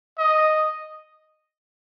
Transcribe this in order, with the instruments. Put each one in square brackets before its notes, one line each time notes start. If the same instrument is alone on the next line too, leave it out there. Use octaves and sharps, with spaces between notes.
[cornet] D#5